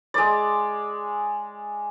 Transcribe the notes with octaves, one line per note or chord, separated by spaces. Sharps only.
G#3 D5